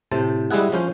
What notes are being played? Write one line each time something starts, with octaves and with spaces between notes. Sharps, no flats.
A2 C3 C5 A5
G3 G#3 E4 G#4 F#5
F3 C#4 C5